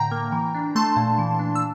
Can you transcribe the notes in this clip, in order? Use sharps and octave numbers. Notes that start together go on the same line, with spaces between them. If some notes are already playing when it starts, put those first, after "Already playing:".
Already playing: A2 D3 G5 A#5
A#3
E3
D4
A3 A5 C6
A#2
E3
D4
E6